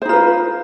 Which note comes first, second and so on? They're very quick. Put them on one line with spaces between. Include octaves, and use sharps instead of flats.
C5 D#4 F4 B4